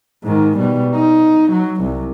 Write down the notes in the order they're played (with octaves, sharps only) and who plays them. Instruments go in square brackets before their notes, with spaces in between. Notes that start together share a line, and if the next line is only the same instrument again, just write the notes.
[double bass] G#2 D#3
B2 G3
D#4
F#3
C2